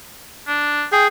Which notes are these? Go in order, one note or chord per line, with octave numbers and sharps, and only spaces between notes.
D4
G#4 G5